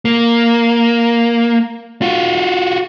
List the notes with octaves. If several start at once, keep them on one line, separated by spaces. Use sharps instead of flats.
A#3
F4 F#4